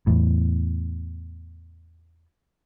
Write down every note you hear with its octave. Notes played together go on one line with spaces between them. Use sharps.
E2 A2